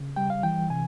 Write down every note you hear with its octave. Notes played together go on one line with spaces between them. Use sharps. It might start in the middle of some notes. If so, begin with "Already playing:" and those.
Already playing: C#3
G3 G5
F5
E3 G5
C3 G#5